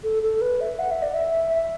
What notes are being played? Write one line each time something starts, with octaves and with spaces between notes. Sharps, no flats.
A4
A4
B4
E5
F#5
E5
D5
E5
E5